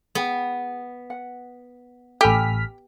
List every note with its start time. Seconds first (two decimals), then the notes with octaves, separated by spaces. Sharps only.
0.15 B3 G#4 G5
1.10 F#5
2.21 A1 G4 A4 G#5 B5 F6 B6